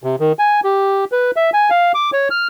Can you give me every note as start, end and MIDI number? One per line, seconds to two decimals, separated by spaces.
0.04 0.16 48
0.20 0.32 51
0.39 0.60 80
0.64 1.05 67
1.12 1.31 71
1.36 1.50 76
1.53 1.70 80
1.70 1.92 77
1.94 2.11 86
2.13 2.28 73
2.30 2.48 89